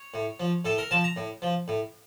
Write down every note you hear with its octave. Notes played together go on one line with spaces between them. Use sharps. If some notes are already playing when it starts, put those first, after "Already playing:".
Already playing: C#5
A2
F3
A2 A4
A#4
F3 A5
A#5
A2
F3
A2